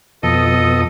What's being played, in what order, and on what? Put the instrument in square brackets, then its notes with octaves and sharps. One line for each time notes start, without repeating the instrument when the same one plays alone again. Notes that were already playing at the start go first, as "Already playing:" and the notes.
[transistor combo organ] F2 B2 D#6 [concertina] A4 D#5